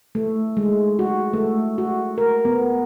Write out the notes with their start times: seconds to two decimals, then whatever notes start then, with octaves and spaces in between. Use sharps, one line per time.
0.15 A3
0.57 G#3
0.99 F#4
1.33 A3
1.78 F#4
2.18 A#4
2.45 B3